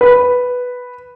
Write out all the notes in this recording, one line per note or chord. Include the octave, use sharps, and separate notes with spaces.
B4